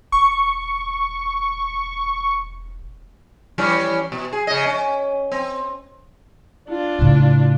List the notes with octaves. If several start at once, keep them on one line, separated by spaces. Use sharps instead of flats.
E1 C#6
E3 G3 C#4
B2
G#4
C#3 D#5
C#4
C4
D4 F4
A2 C#3